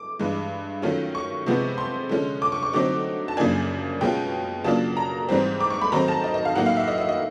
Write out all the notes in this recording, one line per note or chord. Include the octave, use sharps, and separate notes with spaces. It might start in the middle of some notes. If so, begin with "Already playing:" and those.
Already playing: D6
G2 E3 G#3
D#3 F#3 A3 C#4 F4
C#6
C3 F3 G#3 B3
C6
D3 F3 G#3 C#4
D6
C#6
C#6
D3 F#3 A3 C4 D#4 D6
A5
F#2 C#3 F3 A#3 D4 G#5
B2 G#3 C#4 F4 G5
C#3 F#3 A#3 D4 F4 A5
A#5
G#2 E3 G3 C4
D6
C#6
B5
D#3 F#3 A3 C4 D#4 A#5
A5
D#5
D#5
F5
A2 F#3 A#3 D#4 F#5
F5
E5
D#5
D#5
D#5